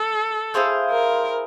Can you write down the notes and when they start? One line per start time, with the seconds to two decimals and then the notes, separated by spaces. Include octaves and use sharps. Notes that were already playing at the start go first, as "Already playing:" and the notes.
Already playing: A4
0.54 E4 G#4 C5 F5
0.90 A#4